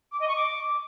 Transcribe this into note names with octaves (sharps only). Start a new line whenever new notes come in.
D6
D#5
C#6
D6